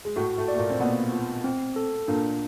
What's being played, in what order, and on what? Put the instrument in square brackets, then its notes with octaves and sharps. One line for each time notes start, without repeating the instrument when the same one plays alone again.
[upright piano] G#3
[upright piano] A2 A3 [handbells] F#4
[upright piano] A2 A3
[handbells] D5
[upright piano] A3
A#2 A#3
C4
[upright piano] B2 B3 [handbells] A#3
[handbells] F4
C4
A4
[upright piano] A#2 A#3 [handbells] D4